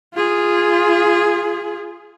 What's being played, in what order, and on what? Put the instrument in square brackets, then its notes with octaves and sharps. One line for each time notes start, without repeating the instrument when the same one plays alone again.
[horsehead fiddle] F4 G#4